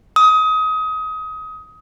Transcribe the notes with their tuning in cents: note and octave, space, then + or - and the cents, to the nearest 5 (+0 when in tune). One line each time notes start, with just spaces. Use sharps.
D#6 +25